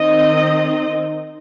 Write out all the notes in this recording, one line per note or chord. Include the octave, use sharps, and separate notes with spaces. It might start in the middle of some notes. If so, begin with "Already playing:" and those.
Already playing: D#3 C4 D#4 D#5